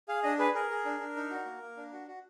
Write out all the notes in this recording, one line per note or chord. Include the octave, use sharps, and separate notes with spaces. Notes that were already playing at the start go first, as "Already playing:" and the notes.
G#4 F5
D4 D#5
G#4 B4
G#4 A#4
G#4
D4
D4
D#4
F#4
A#3
A#3
D4
F#4
F#4